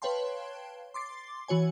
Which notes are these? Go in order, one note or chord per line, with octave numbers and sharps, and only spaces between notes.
B4 C#5 F5 G5 A5 C6
C6 D6 A6 C7
E3 F#4 C#5 G#5